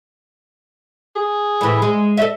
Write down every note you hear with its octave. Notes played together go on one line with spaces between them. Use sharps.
G#4
A2 E3
G#3
A4 D#5 E5